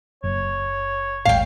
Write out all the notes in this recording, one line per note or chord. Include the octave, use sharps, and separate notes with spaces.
F#1 C#5
D1 G#1 F5 G5